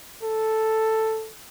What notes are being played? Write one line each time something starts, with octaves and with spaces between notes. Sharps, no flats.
A4